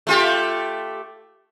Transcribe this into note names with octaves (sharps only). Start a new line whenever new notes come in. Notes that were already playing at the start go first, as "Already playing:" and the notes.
A3 F4 G4